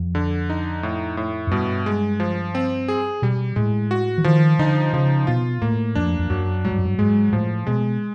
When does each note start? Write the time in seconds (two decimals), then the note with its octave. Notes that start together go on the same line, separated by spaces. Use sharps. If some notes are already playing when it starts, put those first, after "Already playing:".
Already playing: F2
0.15 D3
0.50 D#4
0.83 A2
1.17 A2
1.47 F#2
1.51 G2 B2
1.86 G#3
2.20 F3
2.55 C4
2.88 G#4
3.22 B2 G3
3.56 A2 G#3
3.91 F#4
4.18 E3
4.24 D#3 F3
4.59 D3 D#4
4.93 C#3 F3
5.27 B2 F4
5.62 A2 A#3
5.95 F2 D4
6.19 F2
6.30 F#2 F#3
6.64 G#2 F#3
6.71 G2
6.78 F#2
6.85 G2
6.98 G#2 G#3
7.33 A2 F3
7.67 B2 G#3